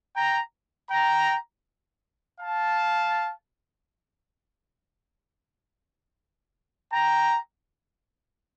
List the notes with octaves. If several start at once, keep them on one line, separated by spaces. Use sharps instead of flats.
G5 A#5
G5 A#5
F5 A5
G5 A#5